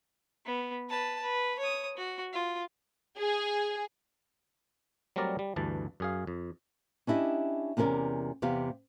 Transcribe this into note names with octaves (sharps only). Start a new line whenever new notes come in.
B3
B4 A5
B4
C#5 D#6
F#4
F4
G#4
F#3 G3 A3 C4 A#4 D5
G3
D2 G2 E3 A5
F#2 G#4 F5
F2
C#4 D4 E4 G4 D#5
E2 C3 C#4 A#4 D5
E2 C3 B3 G4 F5